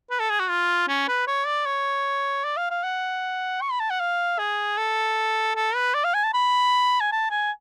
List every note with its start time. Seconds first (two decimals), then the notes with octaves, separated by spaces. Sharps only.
0.10 B4
0.19 A4
0.30 G#4
0.40 F#4
0.49 F4
0.88 C#4
1.08 B4
1.27 C#5
1.46 D5
1.66 C#5
2.44 D5
2.57 F5
2.70 F5
2.84 F#5
3.61 C#6
3.71 B5
3.80 A5
3.90 F#5
4.00 F5
4.39 G#4
4.78 A4
5.56 A4
5.75 B4
5.94 D5
6.04 F5
6.14 G#5
6.24 A5
6.34 B5
7.00 G#5
7.12 A5
7.31 G#5